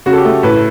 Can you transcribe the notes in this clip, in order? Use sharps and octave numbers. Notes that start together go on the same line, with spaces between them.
C#3 F#4
A4
G4
A3
A2 B4